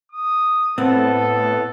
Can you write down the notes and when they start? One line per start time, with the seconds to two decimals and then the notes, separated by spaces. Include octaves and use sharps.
0.12 D#6
0.78 A2 B3 C4 A4